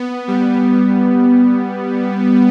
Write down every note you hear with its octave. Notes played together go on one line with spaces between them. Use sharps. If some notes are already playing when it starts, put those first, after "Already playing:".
Already playing: B3
G3